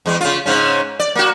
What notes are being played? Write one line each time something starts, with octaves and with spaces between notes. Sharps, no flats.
E2 G#3
C#3 F4
G#2 C#3 C#4
D5
A#3 F#4